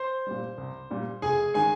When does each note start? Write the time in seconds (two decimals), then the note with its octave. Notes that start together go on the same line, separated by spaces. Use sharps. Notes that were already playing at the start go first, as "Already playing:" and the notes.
Already playing: C5 C6
0.27 A#2 G3
0.58 C2
0.90 A#2 G3
1.22 F1 G#4 G#5
1.54 D#3 G#3 G#4 G#5